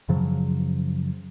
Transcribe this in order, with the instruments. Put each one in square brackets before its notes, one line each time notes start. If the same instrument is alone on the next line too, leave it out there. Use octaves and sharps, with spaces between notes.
[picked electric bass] F#2 C#3 F3 F#3